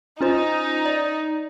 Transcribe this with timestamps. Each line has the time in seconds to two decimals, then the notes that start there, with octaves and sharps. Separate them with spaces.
0.21 C#4 D#4 F4 C5
0.86 D5